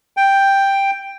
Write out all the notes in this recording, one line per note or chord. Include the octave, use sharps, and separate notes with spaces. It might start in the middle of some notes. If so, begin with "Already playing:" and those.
G5